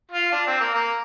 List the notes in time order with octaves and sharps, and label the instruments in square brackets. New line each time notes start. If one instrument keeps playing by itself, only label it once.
[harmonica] F4
D4
C4
A#3
A#3